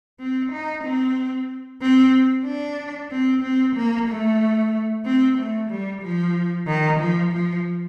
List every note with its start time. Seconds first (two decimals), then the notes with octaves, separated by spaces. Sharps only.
0.20 C4
0.52 D#4
0.84 C4
1.82 C4
2.46 D4
3.11 C4
3.43 C4
3.76 A#3
4.08 A3
5.05 C4
5.38 A3
5.71 G3
6.02 F3
6.66 D#3
7.00 F3
7.32 F3